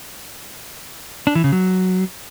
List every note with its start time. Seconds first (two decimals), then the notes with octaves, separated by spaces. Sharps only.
1.27 D4
1.35 E3
1.44 C#3
1.52 F#3